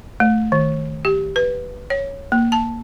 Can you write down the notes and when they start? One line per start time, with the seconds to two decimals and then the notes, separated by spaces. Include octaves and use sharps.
0.20 A3
0.52 D#3
1.05 G4
1.36 B4
1.90 C#5
2.32 A#3
2.52 A5